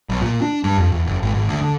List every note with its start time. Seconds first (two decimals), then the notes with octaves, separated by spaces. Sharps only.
0.09 B1
0.21 A#2
0.42 D4
0.64 G2
0.78 F2
0.92 E2
1.07 F#1
1.22 G#1
1.34 G#1
1.49 D2
1.61 D3